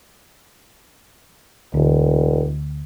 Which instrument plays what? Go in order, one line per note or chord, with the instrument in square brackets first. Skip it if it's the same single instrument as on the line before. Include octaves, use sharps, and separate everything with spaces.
[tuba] E1 [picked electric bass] D2